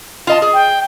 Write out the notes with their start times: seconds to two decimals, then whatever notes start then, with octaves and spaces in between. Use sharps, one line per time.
0.27 F4 D#5 A5
0.42 G#4
0.54 G5